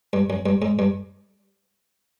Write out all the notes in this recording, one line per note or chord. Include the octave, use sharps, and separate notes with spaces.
G2
F#2
G2
G#2
G2